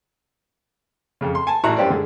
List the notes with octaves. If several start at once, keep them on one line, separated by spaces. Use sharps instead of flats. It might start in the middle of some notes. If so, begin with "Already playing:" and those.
F2 C#3
C6
G#5 A5
A1 E4 F#4 A#5 C#6 F#6
F#2 C#4 G4 C5 D5
D3 G#3